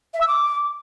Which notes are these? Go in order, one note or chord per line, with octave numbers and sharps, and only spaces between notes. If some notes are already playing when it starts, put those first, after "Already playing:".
E5
E6
D6